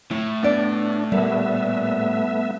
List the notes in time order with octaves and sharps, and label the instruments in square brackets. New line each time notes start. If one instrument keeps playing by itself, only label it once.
[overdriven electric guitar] A2 [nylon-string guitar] E4
[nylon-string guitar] B3 D5 [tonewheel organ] D4
[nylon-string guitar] A#2 [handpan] G3 [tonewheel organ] A3 B3 E5